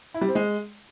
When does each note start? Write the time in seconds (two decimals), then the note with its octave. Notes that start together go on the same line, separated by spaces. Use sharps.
0.14 E4
0.21 G3
0.28 C4
0.35 G#3